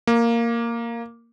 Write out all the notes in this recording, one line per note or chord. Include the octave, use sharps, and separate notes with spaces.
A#3